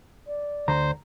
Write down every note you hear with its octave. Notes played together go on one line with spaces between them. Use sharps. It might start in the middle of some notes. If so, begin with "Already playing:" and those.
D5
D2 C5 A#5